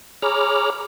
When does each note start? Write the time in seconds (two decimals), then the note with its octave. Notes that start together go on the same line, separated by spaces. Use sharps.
0.22 G#4 C#5 A#5 B5 D6 F6